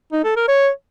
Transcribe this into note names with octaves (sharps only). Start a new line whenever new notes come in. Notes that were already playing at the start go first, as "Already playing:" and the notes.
D#4
A4
A#4
C#5